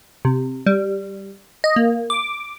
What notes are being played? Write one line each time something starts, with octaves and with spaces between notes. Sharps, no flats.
C3
G3
D#5
A#3
D6